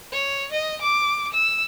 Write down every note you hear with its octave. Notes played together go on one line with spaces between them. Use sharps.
C#5
D#5
D6
E6